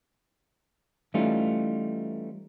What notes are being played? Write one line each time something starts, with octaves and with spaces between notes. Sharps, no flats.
E3 G3 A3 C#4 D#4 F4